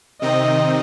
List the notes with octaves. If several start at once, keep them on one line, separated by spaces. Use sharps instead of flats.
C3 D#3 C4 D#4 D#5